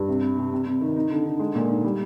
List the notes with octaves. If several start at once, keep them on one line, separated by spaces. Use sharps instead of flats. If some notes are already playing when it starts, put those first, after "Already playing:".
Already playing: G2
C3
C3
C3
C3
C3
D#3
D#4
D3
D3
G#3
A#2
D#4
G3